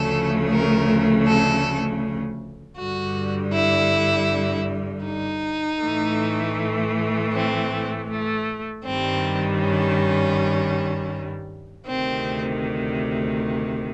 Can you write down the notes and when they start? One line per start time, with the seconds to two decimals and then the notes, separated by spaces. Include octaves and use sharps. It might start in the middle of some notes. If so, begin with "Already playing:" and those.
Already playing: D2 C#3 F3 A3 A4
0.51 A#4
1.26 A4
2.78 G2 D3 G3 F#4
3.54 E4
5.06 D#4
5.82 A2 E3 A3
7.34 C4
8.09 A3
8.85 G2 D#3 G3 C4
9.60 C#4
11.88 D2 C3 D#3 C4